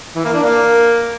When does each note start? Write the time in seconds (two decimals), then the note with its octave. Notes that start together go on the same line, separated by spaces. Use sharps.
0.16 E3
0.25 A#3
0.34 D4
0.43 A#3